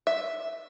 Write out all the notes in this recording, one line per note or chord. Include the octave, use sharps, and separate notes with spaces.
E5